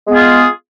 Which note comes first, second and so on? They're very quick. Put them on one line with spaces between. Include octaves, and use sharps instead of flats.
G#3 B3 G#4 F4